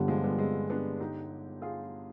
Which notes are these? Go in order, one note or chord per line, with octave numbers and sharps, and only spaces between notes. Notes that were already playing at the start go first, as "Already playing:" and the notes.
Already playing: G1 G2 D3 G3
F3 G#3
G3 B3
G#3 C4
B3 D4
D#4 G4
F4 G#4